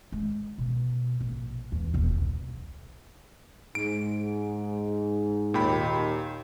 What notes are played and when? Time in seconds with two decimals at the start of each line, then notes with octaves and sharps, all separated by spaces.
0.12 G#3
0.58 B2
1.21 A#1
1.72 E2 E3
1.94 D#1 B1
2.17 E2
3.75 G#2 D7
5.54 D#2 A#2 G5 B5